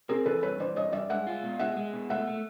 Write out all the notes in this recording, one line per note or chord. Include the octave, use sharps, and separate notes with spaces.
C4 G#4 A#4
E3 A4 B4
G2 B4 C#5
E3 C5 D5
G2 C#5 D#5
G2 D5 E5
G#3 E5 F#5
F4
B2
G#3 E5 F#5
G#3
B2
A3 E5 F#5
A3